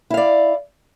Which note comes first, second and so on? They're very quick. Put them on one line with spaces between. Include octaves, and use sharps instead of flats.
E4 F5 D5